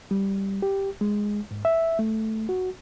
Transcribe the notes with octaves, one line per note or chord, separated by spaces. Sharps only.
G3
G4
G#3
G#2
E5
A3
F#4